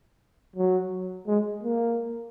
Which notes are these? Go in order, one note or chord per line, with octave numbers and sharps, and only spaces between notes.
F#3
G#3
A#3